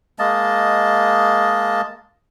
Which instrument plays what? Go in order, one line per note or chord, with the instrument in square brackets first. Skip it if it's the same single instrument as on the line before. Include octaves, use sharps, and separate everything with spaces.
[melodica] G#3 A#3 D#5 A5